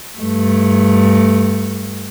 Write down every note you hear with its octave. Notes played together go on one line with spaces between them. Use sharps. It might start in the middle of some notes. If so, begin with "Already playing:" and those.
G2 A3